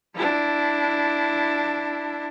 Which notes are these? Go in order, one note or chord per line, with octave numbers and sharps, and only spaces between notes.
D4 E4